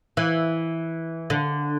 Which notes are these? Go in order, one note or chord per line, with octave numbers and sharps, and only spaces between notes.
E3
D3